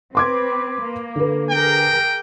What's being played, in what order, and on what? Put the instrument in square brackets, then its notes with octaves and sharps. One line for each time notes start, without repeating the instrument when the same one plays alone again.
[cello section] C4 B4 [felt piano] C6 D6 G#6
[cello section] A#3
[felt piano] D3 B4
[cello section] G#4 A#4 [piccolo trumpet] G5